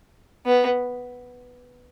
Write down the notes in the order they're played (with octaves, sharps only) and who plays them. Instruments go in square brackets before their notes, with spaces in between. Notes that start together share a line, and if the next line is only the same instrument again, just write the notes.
[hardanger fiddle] B3